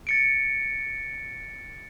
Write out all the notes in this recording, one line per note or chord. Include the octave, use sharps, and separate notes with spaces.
A6 C#7 D7